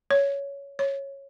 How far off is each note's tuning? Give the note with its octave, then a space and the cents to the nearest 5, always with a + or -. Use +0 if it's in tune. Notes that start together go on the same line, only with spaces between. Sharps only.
C#5 +15
C#5 -10